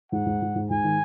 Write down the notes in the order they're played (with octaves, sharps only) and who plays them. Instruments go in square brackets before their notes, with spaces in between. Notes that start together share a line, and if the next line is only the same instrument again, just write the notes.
[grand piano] G#2 [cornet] F#5
[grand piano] G#2
G#2
G#2
[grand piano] G#2 [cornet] G#5
[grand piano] D#3